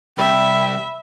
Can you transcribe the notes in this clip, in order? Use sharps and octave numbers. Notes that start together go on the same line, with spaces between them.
C2 E5 G5 B5